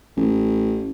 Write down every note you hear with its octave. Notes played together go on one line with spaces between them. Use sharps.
A1